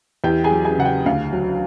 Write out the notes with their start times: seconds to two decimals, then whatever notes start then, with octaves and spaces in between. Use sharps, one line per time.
0.24 E2 G4 G5
0.44 G#4 G#5
0.51 F#3
0.65 G#4 G#5
0.78 C#3 F#5
0.85 G4 G5
1.06 D2 F5
1.33 F#3